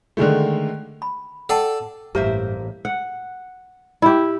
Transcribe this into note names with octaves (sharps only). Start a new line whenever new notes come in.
D3 D#3 G#3 A3
B5
A4 D5 F#5 G5 A5
A1 G2 A#3 G4 C5 E5
F#5
E4 G4